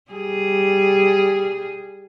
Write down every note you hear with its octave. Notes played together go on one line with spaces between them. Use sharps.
G3 G#4